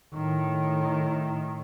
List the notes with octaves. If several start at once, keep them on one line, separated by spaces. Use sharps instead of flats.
A2 D#3